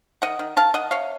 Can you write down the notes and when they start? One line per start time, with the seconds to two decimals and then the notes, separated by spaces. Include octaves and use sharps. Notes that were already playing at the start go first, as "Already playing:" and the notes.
0.22 D#3 D#5 F#5
0.39 D#3
0.56 D#3 F5 A5
0.74 D#3 D#5 F#5
0.91 C3 C#5 F5